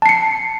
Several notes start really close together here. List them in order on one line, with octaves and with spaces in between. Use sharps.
A5 C7 C#7